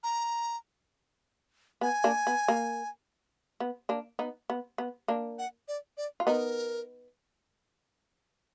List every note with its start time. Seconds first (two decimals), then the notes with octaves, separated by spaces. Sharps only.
0.03 A#5
1.81 B3 G#5
2.04 A#3 D4
2.27 B3
2.48 A#3
3.60 B3
3.89 A#3 D4
4.19 B3 D#4
4.50 B3
4.78 B3
5.08 A#3 D4
5.39 F#5
5.68 D5
5.97 D5
6.20 F4
6.27 B3 D#4 A#4